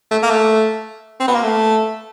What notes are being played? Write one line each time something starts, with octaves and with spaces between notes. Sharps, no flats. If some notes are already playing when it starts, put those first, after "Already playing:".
A3
A#3
A3
C4
B3
A#3
A3